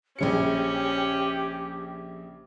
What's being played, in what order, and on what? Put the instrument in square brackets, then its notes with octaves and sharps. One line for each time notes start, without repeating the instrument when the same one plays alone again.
[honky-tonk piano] A#1 C#3 C#7 [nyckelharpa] C#4 [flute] G4